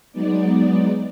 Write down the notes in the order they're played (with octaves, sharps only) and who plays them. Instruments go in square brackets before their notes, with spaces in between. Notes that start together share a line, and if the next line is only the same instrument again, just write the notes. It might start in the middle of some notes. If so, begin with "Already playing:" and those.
[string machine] F#3 G#3 B3 D#4 D5